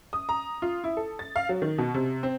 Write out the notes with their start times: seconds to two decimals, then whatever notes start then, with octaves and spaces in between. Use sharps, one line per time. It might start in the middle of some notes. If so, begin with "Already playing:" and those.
0.13 D#6
0.29 A#5
0.62 F4
0.84 E4
0.97 A4
1.19 A6
1.36 F5
1.49 F#3
1.62 D#3
1.78 B2
1.94 C3
2.23 C4